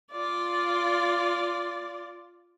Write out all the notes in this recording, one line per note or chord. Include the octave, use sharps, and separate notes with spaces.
F4 D5